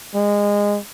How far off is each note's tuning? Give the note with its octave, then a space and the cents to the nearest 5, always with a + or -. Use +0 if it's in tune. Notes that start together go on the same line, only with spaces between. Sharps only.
G#3 -20